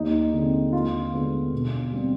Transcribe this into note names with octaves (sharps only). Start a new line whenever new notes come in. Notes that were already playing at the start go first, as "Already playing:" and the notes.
Already playing: D#2 D#4
D3 G#3 C4
D#2 F4
D3 G#3 B3
B2
G3 C4